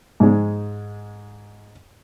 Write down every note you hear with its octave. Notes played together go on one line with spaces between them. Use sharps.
G#2 G#3